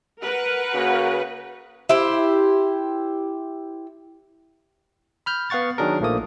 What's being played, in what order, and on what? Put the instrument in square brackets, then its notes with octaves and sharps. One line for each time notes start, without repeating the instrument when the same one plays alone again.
[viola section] A#4 B4 F#5
[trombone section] C#3 A#3 F#4
[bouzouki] E4 G4 C5
[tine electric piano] B5 F6 G6
B3 F5 F#5 C#6 A6
D#3 F#3 D4 G#4 A#4
A#1 F3 A3 A#3 D#6